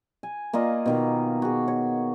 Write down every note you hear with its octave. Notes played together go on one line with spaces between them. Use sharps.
G#5
A#3 F4 D5 D#5
B2 D#3 A#3
F#4 G#4
C#5